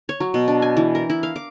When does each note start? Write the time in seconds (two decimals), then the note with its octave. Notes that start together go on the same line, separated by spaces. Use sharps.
0.09 C#5
0.20 F#3
0.34 B2
0.48 D4
0.62 G#5
0.77 E3
0.95 A#4
1.10 E4
1.23 F5
1.36 D6